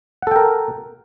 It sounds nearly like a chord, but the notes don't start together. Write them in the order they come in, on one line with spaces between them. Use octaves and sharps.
F#5 A4 G5 A#4